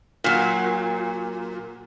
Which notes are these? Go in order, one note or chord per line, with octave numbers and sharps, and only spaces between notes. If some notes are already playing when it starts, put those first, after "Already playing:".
A#2 F#3